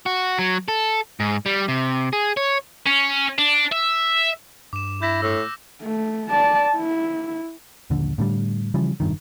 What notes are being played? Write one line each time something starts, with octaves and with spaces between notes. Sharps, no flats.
F#4
F#3
A4
G#2
G3
C3
G#4
C#5
C#4
D4
E5
G2 D6 E7
E4 G6 A#6 B6
A2 E6 F#6 B6
A3
D5 A5
E4
D#1 A#1 D3
A2 D3 G3
C#3 E3 F3 G3
F1 A#1 G2 D#3